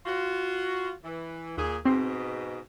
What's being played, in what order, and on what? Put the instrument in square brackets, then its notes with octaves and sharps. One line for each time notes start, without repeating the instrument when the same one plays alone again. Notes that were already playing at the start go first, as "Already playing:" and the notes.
[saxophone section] F4 F#4
E3
[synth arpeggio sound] D#2 [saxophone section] A#2 G#4
[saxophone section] G#2 B2 [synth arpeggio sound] C4 C6